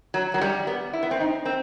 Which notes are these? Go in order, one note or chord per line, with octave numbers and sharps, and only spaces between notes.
F#3
F#3
G3
B3
E4
B3
C4
D#4
C4